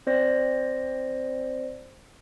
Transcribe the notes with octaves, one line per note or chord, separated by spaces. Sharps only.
C4 C5 D5 A#6